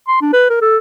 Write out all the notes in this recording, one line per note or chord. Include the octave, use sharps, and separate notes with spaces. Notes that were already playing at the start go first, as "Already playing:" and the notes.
C6
D4
B4
A#4
A4